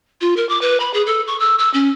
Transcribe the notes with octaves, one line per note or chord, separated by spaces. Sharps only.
F4
A#4
D6
B4
B5
G#4
A4
C#6
E6
E6
C#4